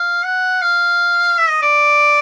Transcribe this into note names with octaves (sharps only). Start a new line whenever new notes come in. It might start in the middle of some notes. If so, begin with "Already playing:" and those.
Already playing: F5
F#5
F5
E5
D#5
D5